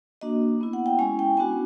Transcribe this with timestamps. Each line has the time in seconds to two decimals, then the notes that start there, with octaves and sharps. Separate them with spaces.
0.21 A#3 D4 F#4 D#5
0.61 B3 E4
0.73 F#5
0.86 G5
0.99 G#3 C#4 E4 G#5
1.19 G5
1.37 B3 D4 F#4 G#5